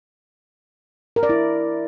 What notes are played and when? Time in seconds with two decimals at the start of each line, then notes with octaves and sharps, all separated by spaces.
1.16 A#4
1.23 D5
1.29 E4